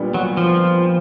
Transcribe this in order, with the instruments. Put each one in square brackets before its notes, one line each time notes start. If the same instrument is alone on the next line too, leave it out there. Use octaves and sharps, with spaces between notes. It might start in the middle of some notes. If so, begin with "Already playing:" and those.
Already playing: [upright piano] A#2 G3 B3 D4
[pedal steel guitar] F#3
F3